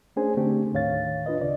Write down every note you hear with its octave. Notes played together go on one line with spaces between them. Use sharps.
A3 C#4 D4 G#4 C5 G#5
D3 A3 C4 D4 G4
D#2 A2 D#3 C#5 F5 A6
D4 F4 B4 D#5
D2 C#3 D5